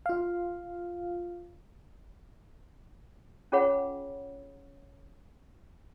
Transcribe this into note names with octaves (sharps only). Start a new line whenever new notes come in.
F4 F5
C#4 F4 G#4 C#5 F#5 B5